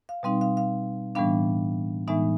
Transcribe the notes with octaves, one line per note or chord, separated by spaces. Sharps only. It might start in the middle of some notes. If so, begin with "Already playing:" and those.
F5
B2 G3 C4 D#4 F5
F5
F5
A2 E3 G3 B3 D4 F5
A2 E3 G#3 B3 D#4 E5